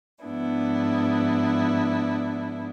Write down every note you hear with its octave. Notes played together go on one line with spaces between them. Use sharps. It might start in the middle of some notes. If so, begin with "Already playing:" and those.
G#2 F3 B3 D4 E4